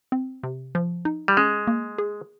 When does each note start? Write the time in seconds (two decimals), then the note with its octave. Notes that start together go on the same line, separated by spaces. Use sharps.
0.12 C4
0.43 C3
0.75 F3
1.05 D#4
1.28 G3
1.37 G#3 C#4
1.67 A#3
1.98 G#4